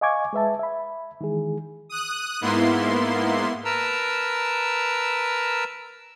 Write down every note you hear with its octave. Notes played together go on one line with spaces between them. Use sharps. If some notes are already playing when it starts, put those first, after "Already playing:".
D#5 F5 G#5 C#6 D6 G#6
G#3 B4 E5 A5
E5 B5
D#3 E3 G#3 G#4
D#6 F#6
G#2 A#3 B3 E4 C6
A#4 B4 A5 A#5 E6